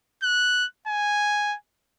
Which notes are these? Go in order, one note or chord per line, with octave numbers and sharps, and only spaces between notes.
F#6
G#5